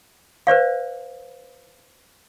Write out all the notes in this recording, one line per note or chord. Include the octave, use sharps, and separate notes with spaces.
B4 C5 D5 F5